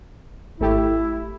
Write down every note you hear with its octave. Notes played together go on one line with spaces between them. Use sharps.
G#1 A3 E4 G4